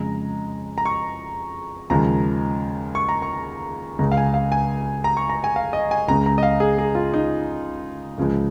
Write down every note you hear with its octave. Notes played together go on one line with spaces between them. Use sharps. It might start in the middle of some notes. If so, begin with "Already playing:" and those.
Already playing: F2 C#3 G#3 A#5
A#5
C#6
D#2 C#3 F3 G#3 A#5
C#6
A#5
C#6
C#2 C#3 G#3 A#5
F5
G#5
F5
G#5
A#5
C#6
A#5
G#5
F5
D#5
G#5
C#2 C#3 G#3 A#5
A#5
D#5
F5
G#4
G#4
F4
D#4
C#2 C#3 F3 G#3